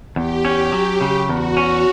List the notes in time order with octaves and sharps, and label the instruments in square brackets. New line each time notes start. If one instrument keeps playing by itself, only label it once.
[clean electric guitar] E2 [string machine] G4
[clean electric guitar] C#4
F#3
C#3
[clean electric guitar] E2 [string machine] F#4
[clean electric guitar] C#4